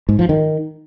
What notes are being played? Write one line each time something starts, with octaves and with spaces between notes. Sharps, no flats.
G#2
F3
D#3